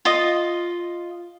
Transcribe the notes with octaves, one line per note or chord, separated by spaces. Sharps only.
F4 D#5